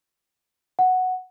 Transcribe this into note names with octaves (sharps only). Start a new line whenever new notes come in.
F#5